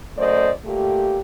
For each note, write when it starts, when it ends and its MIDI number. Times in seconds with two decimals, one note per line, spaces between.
0.17 0.51 42
0.17 0.51 57
0.17 0.51 72
0.17 0.51 74
0.17 0.51 75
0.65 1.18 46
0.65 1.18 57
0.65 1.18 67